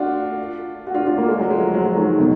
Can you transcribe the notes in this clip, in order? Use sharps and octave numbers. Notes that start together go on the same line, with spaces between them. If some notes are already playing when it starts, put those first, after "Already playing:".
Already playing: D4 F4 F#4
F#4
D4 F4
D4 F4
A#3
G#3
F#3
F3 G#3
F#3
G#3
D#3 F#3
B2 D#3